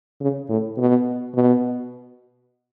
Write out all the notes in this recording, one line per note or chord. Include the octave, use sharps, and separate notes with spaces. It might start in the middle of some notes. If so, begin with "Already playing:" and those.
C#3
A2
B2
B2